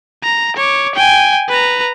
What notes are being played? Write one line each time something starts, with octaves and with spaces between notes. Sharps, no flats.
A#5
C#5 D6
G5 G#5
B4 A#5